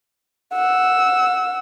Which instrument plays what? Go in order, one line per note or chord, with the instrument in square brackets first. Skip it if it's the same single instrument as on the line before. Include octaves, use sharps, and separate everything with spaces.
[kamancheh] F#5 E6